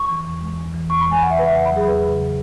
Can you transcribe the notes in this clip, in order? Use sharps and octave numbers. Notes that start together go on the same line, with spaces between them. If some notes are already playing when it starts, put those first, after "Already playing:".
Already playing: C#6
E3
E2
G#3
E2
E3
E2 C#6
B5
G#3
G#5
E2 F#5
E5
C#3 B4
E5
E2 F#5
B5
F#3
G#4
E2 B4
C#3